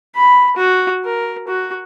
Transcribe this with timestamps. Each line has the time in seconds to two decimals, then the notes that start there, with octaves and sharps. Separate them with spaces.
0.15 B5
0.57 F#4
1.05 A#4
1.48 F#4